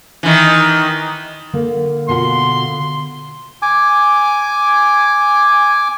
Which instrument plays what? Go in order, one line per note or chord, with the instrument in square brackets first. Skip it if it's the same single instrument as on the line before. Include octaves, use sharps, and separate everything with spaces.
[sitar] D#3 E3
[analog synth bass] D3 [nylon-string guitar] A#3
[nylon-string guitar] B2 F4 F#5 [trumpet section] C6
[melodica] G#5 D6